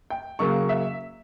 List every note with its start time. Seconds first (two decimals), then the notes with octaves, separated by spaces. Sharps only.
0.10 G5
0.39 C#3 F#3 A#3 C#6
0.69 E5